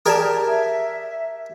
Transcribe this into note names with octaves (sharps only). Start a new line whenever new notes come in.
G4 G#4 A#4 D5 G#5 A5
E5